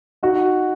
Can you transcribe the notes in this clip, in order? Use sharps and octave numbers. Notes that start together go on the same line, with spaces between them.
D#4 F#4